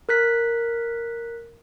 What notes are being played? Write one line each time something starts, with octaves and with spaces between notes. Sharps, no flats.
A#4 F#6 B6